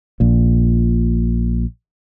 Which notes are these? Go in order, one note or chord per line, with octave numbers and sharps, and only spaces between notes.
A#1 A#2